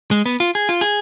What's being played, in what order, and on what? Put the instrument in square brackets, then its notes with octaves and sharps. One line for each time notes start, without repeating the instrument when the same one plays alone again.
[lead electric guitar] G#3
B3
F4
G#4
F4
G#4